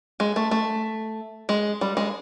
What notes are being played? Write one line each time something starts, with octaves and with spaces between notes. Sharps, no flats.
G#3
A3
A3
G#3
G3
G#3